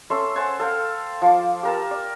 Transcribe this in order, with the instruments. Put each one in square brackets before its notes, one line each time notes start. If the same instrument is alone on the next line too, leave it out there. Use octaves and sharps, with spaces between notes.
[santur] C#4 A4 E5 C6
C5 F#5 G#5 A5
A4 F5 G5
F3 D6
G4 A#4 A5
D5